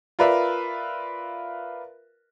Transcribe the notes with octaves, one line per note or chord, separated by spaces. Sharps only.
F4 A#4 B4 D5 E5